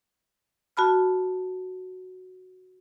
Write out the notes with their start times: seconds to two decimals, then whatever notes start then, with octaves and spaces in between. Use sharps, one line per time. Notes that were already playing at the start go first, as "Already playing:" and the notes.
0.77 F#4 A5 B5 F6